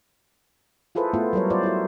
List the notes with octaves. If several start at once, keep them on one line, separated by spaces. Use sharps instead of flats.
E4 F4 G#4 A4 B4 C5
A3 B3 E4 F4
F#3 G3 A#4 C#5
F4 C5 D5
E4 F#4